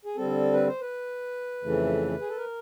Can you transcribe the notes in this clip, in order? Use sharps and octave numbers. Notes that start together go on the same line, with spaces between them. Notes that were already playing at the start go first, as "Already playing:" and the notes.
G#4
D3 G3 C4 A4
B4
C5
B4
F2 C#3 E3 A3
G#4
A4
A#4